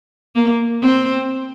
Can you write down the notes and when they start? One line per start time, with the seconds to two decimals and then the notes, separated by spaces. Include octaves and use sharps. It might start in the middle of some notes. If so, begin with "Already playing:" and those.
0.36 A#3
0.82 C4